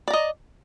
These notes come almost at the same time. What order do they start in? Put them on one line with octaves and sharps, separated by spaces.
D5 A#5 D#5